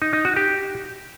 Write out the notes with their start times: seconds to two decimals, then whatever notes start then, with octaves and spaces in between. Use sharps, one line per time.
0.02 D#4
0.13 D#4
0.25 F#4
0.36 G4